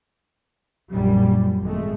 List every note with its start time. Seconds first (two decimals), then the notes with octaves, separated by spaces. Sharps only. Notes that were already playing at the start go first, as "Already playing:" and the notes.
0.92 A#1 F#2 G3
1.61 G#1 G#3 A3